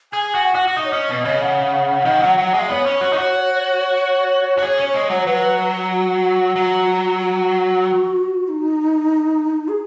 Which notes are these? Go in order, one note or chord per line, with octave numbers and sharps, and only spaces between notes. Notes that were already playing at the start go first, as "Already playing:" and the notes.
G#4 G#5
F#4
F#5
F#4
F#4
D#4 D#5
C#5
C#4 D#5
B2
C#3
F#5
D#3
F#3
F#3
G#3
B3 C#5
C#4
F#4
D#4
F#4
F#4
G#4
C#4
G#3
F#3
F#3 B4
F#4
F#3
F#4
D#4
G#4